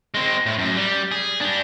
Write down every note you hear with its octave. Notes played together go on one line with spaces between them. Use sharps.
G#3 C4
A2
F#2
G3
G#4
G3 D4